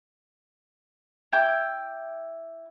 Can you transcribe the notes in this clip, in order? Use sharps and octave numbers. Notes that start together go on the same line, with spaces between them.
E4 G5 D6